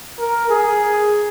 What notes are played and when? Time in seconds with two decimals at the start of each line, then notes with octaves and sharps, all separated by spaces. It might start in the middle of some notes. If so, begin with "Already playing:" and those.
0.19 A#4
0.50 G#4